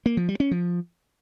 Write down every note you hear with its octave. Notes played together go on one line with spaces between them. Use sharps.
A#3
F3
G3
C#4
F3